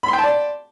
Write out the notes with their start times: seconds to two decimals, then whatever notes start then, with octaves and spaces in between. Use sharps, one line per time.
0.03 B5
0.08 C6
0.13 G5
0.18 A5
0.23 D5